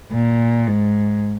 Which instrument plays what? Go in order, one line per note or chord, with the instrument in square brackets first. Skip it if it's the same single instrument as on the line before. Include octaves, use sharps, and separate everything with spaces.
[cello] A#2
G#2